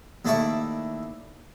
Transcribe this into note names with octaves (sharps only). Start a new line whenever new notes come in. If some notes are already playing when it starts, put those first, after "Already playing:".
D#2 A3 E4 D5 E5 C#6